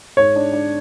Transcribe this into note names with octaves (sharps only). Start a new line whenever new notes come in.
G#2 C#5
D4
D4